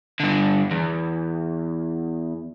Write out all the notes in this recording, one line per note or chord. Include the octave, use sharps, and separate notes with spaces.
G2 D3
E2